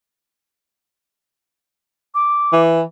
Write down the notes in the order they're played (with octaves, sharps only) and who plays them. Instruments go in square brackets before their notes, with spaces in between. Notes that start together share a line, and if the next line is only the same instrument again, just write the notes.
[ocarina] D6
[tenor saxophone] E3